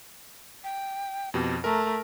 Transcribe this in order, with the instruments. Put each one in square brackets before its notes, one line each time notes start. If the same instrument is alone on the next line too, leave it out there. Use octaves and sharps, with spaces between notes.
[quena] G5
[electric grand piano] F2 B2 [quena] G4
[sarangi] A3 [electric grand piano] A#4 [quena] A#5